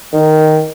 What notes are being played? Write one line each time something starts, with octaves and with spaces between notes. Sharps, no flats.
D#3